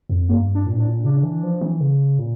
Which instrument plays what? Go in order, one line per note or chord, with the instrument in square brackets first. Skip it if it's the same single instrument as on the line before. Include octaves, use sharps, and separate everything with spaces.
[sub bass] F2
[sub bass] G2 [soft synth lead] A#3
[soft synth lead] D4
[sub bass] A#2
[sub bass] A2 [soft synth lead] D4
[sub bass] A#2
[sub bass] C#3 [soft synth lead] D4
[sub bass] E3
F3
E3
C#3
A#2